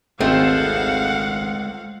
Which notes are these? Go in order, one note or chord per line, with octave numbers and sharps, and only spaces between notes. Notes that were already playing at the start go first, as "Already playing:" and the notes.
G#1 G#3 A3 C4 F4 F5 F#5